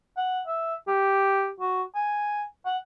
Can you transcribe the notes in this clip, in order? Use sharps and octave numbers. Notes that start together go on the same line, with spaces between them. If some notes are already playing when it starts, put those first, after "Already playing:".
F#5
E5
G4
F#4
G#5
F#5